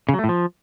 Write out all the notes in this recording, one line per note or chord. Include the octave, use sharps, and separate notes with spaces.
C#3
F#3
A3
A2
F3